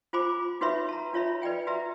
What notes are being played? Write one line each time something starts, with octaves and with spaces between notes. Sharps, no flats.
F4 C5 G#5 B5 D6
D#4 F#4 B4 C#5 E5 B5
A5 A#5
D4 F4 C#5 E5 B5
B4 D5 D#5 G5 G#5
F#4 B4 E5 A#5